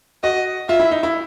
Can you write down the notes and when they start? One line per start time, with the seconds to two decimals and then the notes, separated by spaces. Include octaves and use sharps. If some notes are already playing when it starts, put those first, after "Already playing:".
0.23 F#4 D#5
0.69 F4 E5
0.80 E4
0.91 D#4
1.03 E4